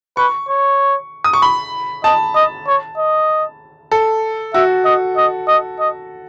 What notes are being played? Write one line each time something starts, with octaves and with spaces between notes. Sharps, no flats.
B4 C#6
C#5
D#6
C#6
B5
D#5 A5
D#5
C#5
D#5
A4
F#4 E5
D#5
D#5
D#5
D#5